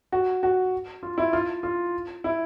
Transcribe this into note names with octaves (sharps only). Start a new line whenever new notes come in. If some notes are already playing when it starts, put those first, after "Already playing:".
F#4
F#4
F4
E4
F4
F4
E4